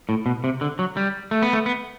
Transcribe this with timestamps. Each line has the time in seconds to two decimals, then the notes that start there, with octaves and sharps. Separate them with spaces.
0.09 A2
0.26 B2
0.44 C3
0.61 D3
0.79 F#3
0.97 G3
1.31 A3
1.42 B3
1.53 A3
1.66 B3